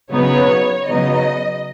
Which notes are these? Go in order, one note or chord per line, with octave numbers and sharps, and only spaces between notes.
C#3 F#3 B3 D#4 C#5
C#3 F#3 B3 D#4 D#5